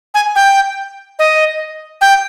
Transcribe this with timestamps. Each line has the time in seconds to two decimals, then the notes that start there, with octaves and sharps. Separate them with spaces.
0.14 G#5
0.36 G5
1.19 D#5
2.01 G5